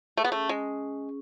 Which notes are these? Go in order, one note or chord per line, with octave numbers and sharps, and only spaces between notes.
A3 G#4
B3
A3 C#4
G#3 C#4